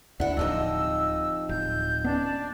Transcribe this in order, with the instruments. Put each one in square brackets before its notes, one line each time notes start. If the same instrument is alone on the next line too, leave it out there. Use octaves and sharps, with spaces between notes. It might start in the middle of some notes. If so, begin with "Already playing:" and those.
[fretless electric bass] D2 [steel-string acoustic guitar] D4 E4 [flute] F#5
[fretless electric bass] D1 [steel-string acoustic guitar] C3 F3 D#4 [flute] E6
[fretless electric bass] D1 [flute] G6
[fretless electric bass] B3 C#4 [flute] D4